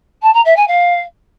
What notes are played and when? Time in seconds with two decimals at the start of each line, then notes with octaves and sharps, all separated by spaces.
0.22 A5
0.33 A#5
0.45 E5
0.56 G#5
0.67 F5